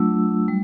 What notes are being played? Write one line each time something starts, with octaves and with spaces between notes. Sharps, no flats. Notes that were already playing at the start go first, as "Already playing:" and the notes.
Already playing: F#3 A3 D4 F4 E6
G3